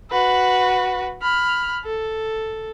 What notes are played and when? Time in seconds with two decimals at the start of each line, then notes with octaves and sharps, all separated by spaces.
0.11 F#4 B4
1.22 B5 F6
1.85 A4